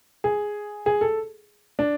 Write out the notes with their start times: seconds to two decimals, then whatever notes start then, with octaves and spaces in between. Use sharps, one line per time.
0.24 G#4
0.86 G#4
1.01 A4
1.79 D4